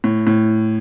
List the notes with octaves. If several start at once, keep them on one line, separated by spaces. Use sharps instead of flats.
A2
A2